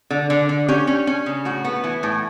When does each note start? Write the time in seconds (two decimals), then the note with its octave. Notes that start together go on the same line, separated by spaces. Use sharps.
0.10 D3
0.30 D3
0.49 D3
0.69 C#4 G4
0.87 C#4
1.07 C#4
1.26 C#3
1.45 A2 F#4
1.64 B3
1.84 E3
2.03 A2